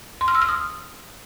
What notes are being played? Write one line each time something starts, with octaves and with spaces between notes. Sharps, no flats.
C6
F6
E6
F6
D#6